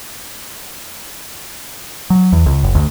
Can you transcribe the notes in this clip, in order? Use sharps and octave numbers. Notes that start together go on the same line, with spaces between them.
F#3
E2
C#2
F#1
D2